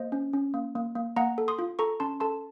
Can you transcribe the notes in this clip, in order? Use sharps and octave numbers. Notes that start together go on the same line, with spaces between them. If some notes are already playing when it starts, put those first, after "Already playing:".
Already playing: A#3 C5 D#5
C#4
C#4
A#3
A#3
A#3
A#3 F#5 A#5
A4
C6 D#6
F4
A4 A#5 C#6
C#4 A5 C6
A4 A5 C6